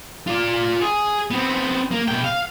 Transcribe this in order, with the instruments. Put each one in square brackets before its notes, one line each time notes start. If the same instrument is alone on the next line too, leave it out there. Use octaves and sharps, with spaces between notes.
[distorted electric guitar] F4 D5
G#4
B3 C4
A#3
B2 G5
F5